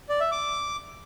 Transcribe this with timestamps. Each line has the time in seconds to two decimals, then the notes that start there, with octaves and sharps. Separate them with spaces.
0.09 D5
0.20 E5
0.32 D6